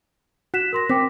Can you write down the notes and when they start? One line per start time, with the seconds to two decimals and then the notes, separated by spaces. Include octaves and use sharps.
0.54 F#4 F#6 B6 E7
0.73 A#4 C6 A#6
0.90 C4 G5 D6 B6